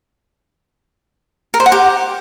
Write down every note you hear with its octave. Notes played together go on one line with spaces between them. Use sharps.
A#4
C5
F#5
G4